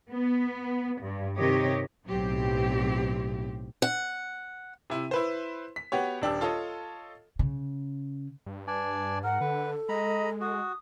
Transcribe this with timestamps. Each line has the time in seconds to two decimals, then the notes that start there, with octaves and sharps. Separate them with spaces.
0.10 B3
1.01 G2
1.39 C3 D#3 G4 C#5 D#5
2.07 B1 A2 F#3 C4 G4
3.82 F#5
4.90 C3 E4
5.11 E4 B4 C5
5.76 B6
5.92 B3 F#4 G4 C#5
6.22 D#1 D4 G4 E6
6.41 F4 A4 C#5 D#5
7.39 C#3
8.46 G2
8.67 D4 B4 D5 G#5
9.24 G#2 A#4 F#5
9.41 D3 A4 B4
9.89 G#3 D#5 A#5 B5
10.41 F#4 D#6